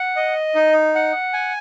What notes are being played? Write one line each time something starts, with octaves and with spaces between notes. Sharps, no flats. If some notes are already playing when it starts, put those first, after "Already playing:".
Already playing: F#5
D#5
D#4
F#5
G#5